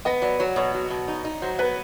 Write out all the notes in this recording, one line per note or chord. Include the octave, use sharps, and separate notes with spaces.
B3 D#5
F#3 D5
F#3 C#5
B2 C#5
F#3
B2
D#4
D#4
F#3 C5
B3 B4